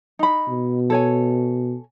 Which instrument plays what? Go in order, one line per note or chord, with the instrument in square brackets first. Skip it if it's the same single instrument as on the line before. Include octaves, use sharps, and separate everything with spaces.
[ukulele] D#4 B5
[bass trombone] B2
[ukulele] A4 C#5 G#5